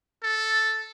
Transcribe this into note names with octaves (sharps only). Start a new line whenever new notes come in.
A4